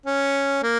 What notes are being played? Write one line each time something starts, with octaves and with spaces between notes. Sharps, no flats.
C#4
A#3